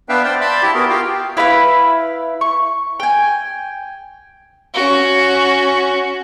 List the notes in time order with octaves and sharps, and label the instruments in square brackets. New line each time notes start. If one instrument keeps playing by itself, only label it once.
[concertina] B3 D4 B4 E5 F5 G5
C5 D5 F5 G5 C6
D5 E5 A5 B5 C6
E4 G4
B3 F#4 G#4 A#4
F4 G4 F5 G5
[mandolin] E4 B4 F5 B5
C#6
G5 G#5
[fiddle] C#4 F#4